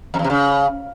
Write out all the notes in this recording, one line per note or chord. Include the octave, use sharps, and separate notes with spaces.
F2
E2
C3
C#3